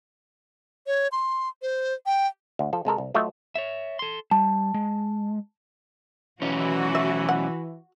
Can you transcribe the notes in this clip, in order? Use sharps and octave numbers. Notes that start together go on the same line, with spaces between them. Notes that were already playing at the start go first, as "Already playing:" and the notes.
C#5
C6
C5
G5
D2
F3 A4
C3 G#3 A4 A#4
C2
F#3 A3 F4 C#5 D#5 E5
C#5 E5
A4 C6
G3 A5
G#3
B1 E3 C#4 F#4
E5
F#5